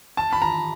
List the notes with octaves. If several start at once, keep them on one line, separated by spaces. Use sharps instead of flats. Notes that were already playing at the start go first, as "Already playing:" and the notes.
A5
B5
A#5